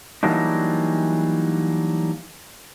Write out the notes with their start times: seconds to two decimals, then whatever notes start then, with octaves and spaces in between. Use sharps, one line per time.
0.23 E3 F#3 G3 A#3 D4 D#4